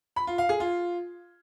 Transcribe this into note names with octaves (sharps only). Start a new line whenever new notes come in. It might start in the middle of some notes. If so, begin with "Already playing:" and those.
B5
F4
F5
G#4
F4